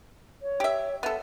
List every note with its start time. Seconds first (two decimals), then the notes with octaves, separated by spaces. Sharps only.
0.42 C#5
0.60 G4 E5
1.03 B3 A4 E5